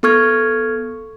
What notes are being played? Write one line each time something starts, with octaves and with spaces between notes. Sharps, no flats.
B3 A4 C#6 F6 G#6